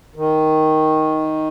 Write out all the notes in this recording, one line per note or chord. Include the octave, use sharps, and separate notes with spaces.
D#3